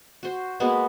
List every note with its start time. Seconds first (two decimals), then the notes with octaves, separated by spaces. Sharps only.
0.23 F#4 C5
0.60 G#3 A#3 B3 F#4